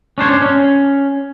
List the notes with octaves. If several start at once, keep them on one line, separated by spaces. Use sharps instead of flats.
C#4 D4 C5 C#5
C#4